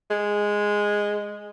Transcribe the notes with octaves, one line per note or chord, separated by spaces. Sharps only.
G#3